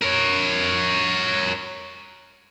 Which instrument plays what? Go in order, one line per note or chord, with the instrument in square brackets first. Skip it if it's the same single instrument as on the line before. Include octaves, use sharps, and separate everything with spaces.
[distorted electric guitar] A#4 C#5